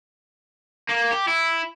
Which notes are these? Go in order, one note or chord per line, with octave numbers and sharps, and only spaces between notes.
A#3
G4
E4